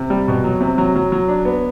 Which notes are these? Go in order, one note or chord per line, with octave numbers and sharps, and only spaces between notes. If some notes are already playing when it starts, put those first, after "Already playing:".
Already playing: C3
G3
B2
F#3
C3
F#3
F#3
F#3
D4
B3